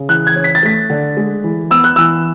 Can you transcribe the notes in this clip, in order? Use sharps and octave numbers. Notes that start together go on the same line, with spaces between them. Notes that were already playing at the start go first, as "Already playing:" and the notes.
Already playing: C#3
E3 F#6
G#6
C#4
B6
A6
A3 B6
D3
G#3
E3
B3 E6
F#6
E3 E6